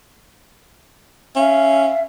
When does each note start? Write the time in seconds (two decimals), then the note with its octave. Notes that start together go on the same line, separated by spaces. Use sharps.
1.36 C#4 E5 F5